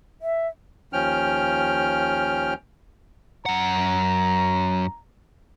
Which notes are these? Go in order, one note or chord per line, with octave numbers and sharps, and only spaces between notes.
E5
D#2 F3 C#4 G5 F6
F#2 F#5 A#5